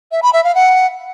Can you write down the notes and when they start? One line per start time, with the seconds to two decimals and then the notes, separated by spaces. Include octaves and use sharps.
0.12 E5
0.22 B5
0.33 E5
0.44 F5
0.55 F#5